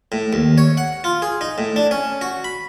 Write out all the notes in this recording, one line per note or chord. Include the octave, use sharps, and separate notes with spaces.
A2
D#2
C#5
F#5
F4
G#4
D#4
A2
D4
C#4
F#4
B5